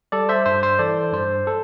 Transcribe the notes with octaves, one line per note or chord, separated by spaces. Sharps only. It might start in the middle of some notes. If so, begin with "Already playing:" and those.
G3 A4 D5
C5 E5
G2 C5
C5
E3 A4 D5
G2 C5
A4